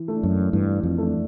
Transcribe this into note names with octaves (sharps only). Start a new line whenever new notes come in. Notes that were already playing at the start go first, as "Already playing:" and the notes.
Already playing: E3
A3 D4
F#2
G2 E3
F2
A3 D4